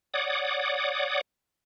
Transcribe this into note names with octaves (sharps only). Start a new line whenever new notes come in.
C#5 D5 F#5 D6 D#6